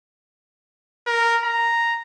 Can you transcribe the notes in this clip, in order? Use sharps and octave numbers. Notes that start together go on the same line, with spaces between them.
A#4
A#5